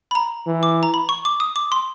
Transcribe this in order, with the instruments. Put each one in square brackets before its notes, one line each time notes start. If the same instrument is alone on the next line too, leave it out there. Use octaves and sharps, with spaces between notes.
[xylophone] B5
A#5
[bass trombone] E3
[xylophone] D6
A#5
B5
C#6
D6
D#6
D6
C6